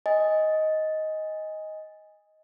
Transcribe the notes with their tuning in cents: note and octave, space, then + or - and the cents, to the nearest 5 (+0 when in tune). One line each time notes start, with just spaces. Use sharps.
D#5 +10 G#5 -15